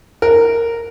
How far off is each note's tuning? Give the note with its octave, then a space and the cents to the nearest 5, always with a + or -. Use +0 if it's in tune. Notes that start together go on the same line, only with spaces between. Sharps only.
A#4 -10